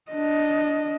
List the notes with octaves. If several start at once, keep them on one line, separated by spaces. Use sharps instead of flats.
D4 D#5